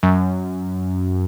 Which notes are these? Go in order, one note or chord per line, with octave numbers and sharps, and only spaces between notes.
F#2